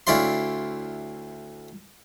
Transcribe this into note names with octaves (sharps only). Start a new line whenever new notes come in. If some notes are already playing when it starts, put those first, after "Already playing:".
D2 E4 C#5 D5 F5 C6